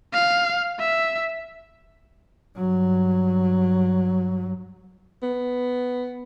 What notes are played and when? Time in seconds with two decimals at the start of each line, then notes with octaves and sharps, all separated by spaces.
0.14 F5
0.80 E5
2.56 G2 F#3
5.22 B3